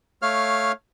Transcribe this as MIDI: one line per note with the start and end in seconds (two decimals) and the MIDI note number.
0.22 0.72 57
0.22 0.72 73
0.22 0.72 77
0.22 0.72 89